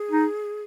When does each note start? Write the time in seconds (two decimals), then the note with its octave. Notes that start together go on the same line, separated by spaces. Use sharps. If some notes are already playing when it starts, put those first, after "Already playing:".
Already playing: G#4
0.11 D#4